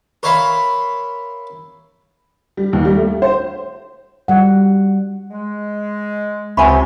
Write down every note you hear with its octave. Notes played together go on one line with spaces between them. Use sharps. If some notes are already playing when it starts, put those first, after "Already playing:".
A#4 C#5 E5 F5 B5 C6
G3
D#2
G3
A3
C5
G3 F#5
G#3
C#2 C3 E5 F#5 G#5 B5 C#6